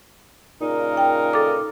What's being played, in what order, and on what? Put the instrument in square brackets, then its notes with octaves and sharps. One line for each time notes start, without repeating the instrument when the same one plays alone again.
[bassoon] A#2 [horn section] C#3 D#4 A#4
[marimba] G5
A4 D6